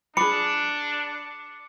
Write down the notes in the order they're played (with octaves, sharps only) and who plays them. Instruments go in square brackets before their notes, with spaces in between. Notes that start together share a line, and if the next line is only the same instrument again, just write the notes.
[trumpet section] D4 [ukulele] G#4 B5 [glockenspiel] D6 C#7